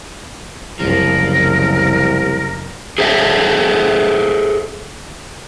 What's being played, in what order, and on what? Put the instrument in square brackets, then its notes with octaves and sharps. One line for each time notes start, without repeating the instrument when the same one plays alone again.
[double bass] F#1 C#3 [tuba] C2 [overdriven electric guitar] F3 [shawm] A#4
[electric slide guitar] G#4 A4 C5 D#5 E5